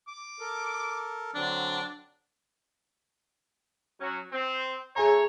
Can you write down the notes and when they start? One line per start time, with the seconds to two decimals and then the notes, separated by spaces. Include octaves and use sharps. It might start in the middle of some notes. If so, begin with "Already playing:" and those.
0.08 D6
0.40 A4 A#4
1.35 D3 F#3 C4 D4
4.00 F#3 C#4 F#4
4.31 C4
4.96 A3 G#4 C#5 G#5 A#5